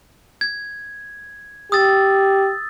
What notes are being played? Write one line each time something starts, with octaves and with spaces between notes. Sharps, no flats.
G#6
G4 D#6 E6 A6